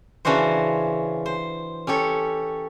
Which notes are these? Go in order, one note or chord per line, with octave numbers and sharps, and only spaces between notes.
C#3 E3 C#4 D4 F#4 C5
C5
C#4 G4 A4 C#5